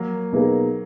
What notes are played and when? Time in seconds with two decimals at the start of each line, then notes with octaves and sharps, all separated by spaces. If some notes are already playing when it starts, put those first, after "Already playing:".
Already playing: F#3 A#3
0.32 B2 A#3 D#4 G#4 B4